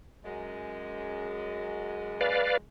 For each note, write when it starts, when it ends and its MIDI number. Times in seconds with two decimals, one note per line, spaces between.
0.25 2.62 42
0.25 2.62 56
2.21 2.57 71
2.21 2.57 74
2.21 2.57 77